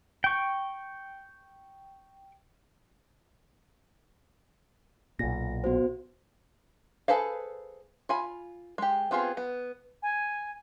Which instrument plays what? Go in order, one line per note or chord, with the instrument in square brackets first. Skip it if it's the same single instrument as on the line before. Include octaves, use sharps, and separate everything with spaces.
[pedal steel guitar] G5 C#6
[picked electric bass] B1 A#2 [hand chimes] A#6
[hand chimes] B3 F#4 C5
[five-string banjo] G#4 A4 B4 C5 F5
F4 G#5 B5
G#3 G4
B3 C4 F4 G4 G#4
B3
[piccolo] G#5